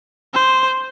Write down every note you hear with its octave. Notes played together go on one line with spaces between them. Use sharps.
C5